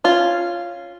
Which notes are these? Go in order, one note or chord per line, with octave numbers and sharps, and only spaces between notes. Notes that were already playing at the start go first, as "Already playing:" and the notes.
C#4 F4